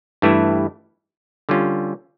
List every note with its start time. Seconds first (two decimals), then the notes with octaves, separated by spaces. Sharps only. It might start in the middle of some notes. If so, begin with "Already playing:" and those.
0.22 G2 E3 A3 E4
1.49 D3 G3 C#4 F4